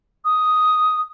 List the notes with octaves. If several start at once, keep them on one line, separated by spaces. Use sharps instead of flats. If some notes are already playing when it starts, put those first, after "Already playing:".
D#6